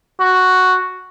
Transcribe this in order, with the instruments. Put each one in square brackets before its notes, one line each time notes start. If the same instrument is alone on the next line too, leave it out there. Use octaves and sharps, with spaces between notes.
[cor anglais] F#4